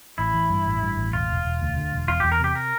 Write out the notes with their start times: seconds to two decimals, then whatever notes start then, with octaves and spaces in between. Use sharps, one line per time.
0.18 A1 E4
0.34 E3
0.50 G2
0.66 A1
0.82 G2
0.97 A1
1.13 E1 F4
1.30 E1
1.45 E1
1.61 D2
1.77 D3
1.92 E1
2.08 E2 F4
2.20 E2 G4
2.32 A#4
2.40 C3 G4
2.55 A#4